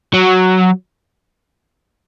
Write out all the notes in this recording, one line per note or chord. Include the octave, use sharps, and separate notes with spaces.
F#3